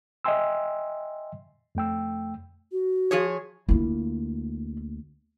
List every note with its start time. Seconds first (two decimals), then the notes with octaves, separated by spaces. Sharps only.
0.24 D#5 E5 G5 G#5 C6 E6
1.75 F2 A3 G5 E6
2.72 F#4
3.11 F3 G#4 C#5
3.69 D2 A#3 E4 F4